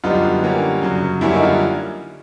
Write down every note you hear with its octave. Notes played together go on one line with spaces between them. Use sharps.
F#2 D3 G3 B3 D#4 F4
D3 G3 A#3 C#4
F#2 C#3 F#3
F#2 D3 G3 A#3 C#4 E4
D#4
F4
E4